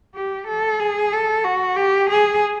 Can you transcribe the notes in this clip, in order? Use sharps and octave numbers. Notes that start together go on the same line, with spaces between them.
G4
A4
G#4
A4
F#4
G4
G#4